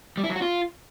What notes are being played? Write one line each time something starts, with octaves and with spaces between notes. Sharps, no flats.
G3
E4
F#3
F#4
F4